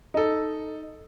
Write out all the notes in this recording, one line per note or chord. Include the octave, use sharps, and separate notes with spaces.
D#4 A4